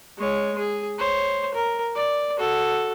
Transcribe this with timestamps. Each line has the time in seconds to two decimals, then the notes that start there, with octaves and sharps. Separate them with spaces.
0.18 G#3 C#5
0.58 G#4
0.99 C5 C#5
1.54 A#4
1.95 D5
2.38 F#4 A4